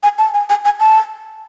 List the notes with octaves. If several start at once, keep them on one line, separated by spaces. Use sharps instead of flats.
G#5
A5
G#5
G#5
G#5
A5